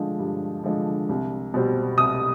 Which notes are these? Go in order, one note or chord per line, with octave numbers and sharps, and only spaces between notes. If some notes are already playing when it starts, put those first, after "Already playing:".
Already playing: D3 F3 G#3
G2
D3 F3 G#3
C2
B2 G3 C4
C2 D#6